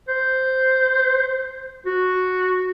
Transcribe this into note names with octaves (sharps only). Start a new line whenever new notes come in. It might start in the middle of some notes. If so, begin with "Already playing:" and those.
C5
F#4